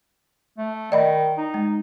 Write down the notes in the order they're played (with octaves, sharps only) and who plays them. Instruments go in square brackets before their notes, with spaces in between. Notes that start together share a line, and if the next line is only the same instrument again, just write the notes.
[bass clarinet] A3
[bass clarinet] D#3 [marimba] D5 D#5 B5
[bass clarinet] D#4
[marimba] G#3